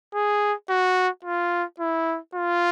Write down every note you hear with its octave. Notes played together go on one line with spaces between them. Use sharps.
G#4
F#4
F4
E4
F4